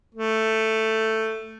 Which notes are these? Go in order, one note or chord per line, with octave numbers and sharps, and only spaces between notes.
A3